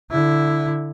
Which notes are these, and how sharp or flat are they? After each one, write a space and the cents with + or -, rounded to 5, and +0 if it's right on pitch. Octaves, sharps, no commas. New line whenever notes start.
D3 +0 E4 +0